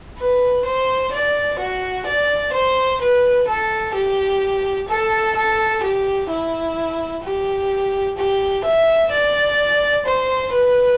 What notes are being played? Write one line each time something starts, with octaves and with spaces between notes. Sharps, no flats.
B4
C5
D5
F#4
D5
C5
B4
A4
G4
A4
A4
G4
E4
G4
G4
E5
D5
C5
B4